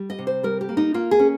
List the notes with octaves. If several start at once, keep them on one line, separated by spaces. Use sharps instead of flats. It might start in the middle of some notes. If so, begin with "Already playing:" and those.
Already playing: G3
D#5
C3
C5
G3 A#4
G4
A#3
D#4
A#3 F4
G#4
C#4